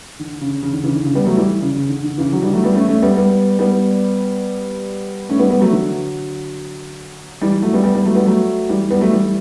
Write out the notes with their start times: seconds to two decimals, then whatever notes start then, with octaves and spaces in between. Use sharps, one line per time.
0.19 D3
0.41 C#3
0.63 C#3
0.73 D3
0.83 C#3 E3
0.94 D3
1.05 C#3
1.15 G3 B3
1.26 F#3 A3
1.37 E3 G3
1.62 C#3
1.76 C#3
1.89 D3
2.04 D3
2.18 C#3 E3
2.32 D3 F#3
2.43 E3 G3
2.53 F#3 A3
2.64 G3 B3
2.75 A3 C#4
2.88 A3 C#4
3.02 G3 B3
3.17 G3 B3
3.59 G3 B3
5.29 A3 C#4
5.39 G3 B3
5.51 G3 B3
5.61 F#3 A3
5.72 D3 F#3
7.41 E3 G3
7.62 F#3 A3
7.73 G3 B3
7.83 G3 B3
7.95 G3 B3
8.05 F#3 A3
8.15 G3 B3
8.26 F#3 A3
8.69 E3 G3
8.91 G3 B3
9.01 F#3 A3
9.11 E3 G3